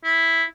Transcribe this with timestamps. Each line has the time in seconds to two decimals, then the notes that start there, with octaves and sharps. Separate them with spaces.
0.04 E4